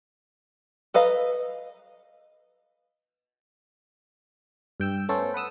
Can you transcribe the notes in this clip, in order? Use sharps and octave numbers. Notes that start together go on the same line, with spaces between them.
A4 B4 D#5 F5 A#5
G2 G5 E6
A3 B3 C#4 A4 C5
B4 F#5 D#6 E6